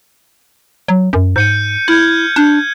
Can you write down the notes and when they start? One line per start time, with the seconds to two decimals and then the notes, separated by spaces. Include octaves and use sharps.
0.88 F#3
1.13 F#2
1.36 G#2 G6 C#7 D#7
1.88 E4 F6 G6 G#6
2.36 D4 G6